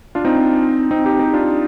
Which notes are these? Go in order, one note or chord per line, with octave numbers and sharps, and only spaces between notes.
D4 F4
C4 D#4
C4 D#4
D#4 G4
D#4 G4
D4 F4